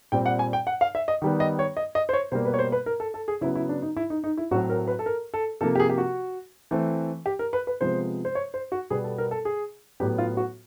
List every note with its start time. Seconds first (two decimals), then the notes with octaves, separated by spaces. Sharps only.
0.12 A#2 G3 C4 G5
0.26 F#5
0.39 G#5
0.53 G5
0.67 F#5
0.81 F5
0.95 E5
1.08 D#5
1.22 D#3 G3 B3
1.40 D#5
1.59 C#5
1.77 D#5
1.95 D#5
2.09 C5
2.13 C#5
2.32 B2 G3 A#3 C5
2.45 B4
2.54 C#5
2.59 C5
2.72 B4
2.86 A#4
3.00 A4
3.14 A4
3.28 G#4
3.41 C#3 F#3 B3 E4
3.56 E4
3.69 D4
3.82 D#4
3.97 E4
4.10 D#4
4.24 D#4
4.38 E4
4.51 A2 F#3 A3 C4 F#4
4.70 A#4
4.88 B4
4.99 A4
5.06 A#4
5.34 A4
5.61 C3 F3 A#3 A4
5.75 G4
5.80 G#4
5.89 G4
5.98 F#4
6.71 E3 A3 C4
7.26 G4
7.39 A#4
7.53 B4
7.67 B4
7.81 C3 F3 G#3 B3 C5
8.25 C5
8.35 C#5
8.54 C5
8.72 F#4
8.90 B2 G3 B3 G#4
9.04 A4
9.18 A#4
9.31 A4
9.45 G#4
10.00 A2 F#3 B3 G4
10.18 F4
10.37 F#4